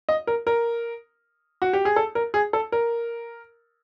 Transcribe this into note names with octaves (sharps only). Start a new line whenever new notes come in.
D#5
A#4
A#4
F#4
G4
G#4
A4
A#4
G#4
A4
A#4